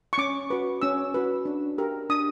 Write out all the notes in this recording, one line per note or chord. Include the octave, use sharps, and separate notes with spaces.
C#6
C#4 D6
F#4 B4
C#4 E6
F#4 B4
D4
G4 A#4
D4 D#6